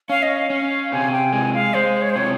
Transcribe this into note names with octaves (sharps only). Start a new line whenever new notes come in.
C#4 F5
D#5
F5
C#4
C3 G#5
G5
G#3 G#5
F5
G#3 C5
C#5
C5
C3 C#5